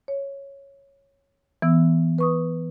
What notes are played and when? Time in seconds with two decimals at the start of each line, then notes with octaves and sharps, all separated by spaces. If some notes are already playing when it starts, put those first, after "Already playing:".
0.08 C#5
1.62 E3 B3 E6
2.18 B4 C#6 D#6